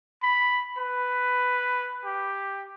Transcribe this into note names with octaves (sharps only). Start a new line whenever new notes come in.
B5
B4
G4